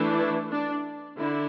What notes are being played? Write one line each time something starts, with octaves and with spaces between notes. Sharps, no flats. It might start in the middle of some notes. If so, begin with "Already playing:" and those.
Already playing: E3 A3 D4
E4
D4
D3 E4